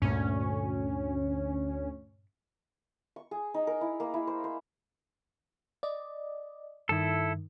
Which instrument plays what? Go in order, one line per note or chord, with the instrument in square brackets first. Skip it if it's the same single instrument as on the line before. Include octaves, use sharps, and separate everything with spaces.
[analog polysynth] D2 C#4 [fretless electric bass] G2 A#2 A3
[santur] C#6
G#4
D#4
A#4
E4
A#3
E4
C5
C5
[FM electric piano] D5 D#5
[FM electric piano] G2 D#3 [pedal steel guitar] E4 A4